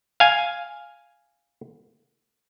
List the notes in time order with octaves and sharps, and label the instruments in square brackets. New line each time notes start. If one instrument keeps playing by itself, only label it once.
[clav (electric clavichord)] F5 G#5